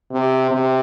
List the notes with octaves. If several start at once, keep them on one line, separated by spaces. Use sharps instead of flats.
C3
C3